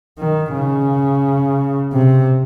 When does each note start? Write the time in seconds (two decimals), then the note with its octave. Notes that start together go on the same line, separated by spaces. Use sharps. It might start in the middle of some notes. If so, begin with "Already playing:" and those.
0.19 D#3
0.54 C#3
1.93 C3